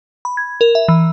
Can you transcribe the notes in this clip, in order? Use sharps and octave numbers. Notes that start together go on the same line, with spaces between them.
B5
G#6
A#4
E5
E3